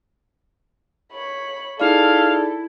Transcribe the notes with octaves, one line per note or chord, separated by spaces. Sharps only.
C#5 B5
D#4 E4 G#4 A4 D5 F5